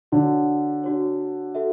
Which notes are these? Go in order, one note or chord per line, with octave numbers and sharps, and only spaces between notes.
D3 D4 F#4 C#5
D4 F#4 C#5
F#4 A4 E5